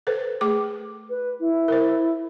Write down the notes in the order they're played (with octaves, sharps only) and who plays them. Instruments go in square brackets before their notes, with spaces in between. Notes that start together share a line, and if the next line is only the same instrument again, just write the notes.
[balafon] A4 B4 C5
A3 G#4 D6
[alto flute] B4
E4
[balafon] A#4 C5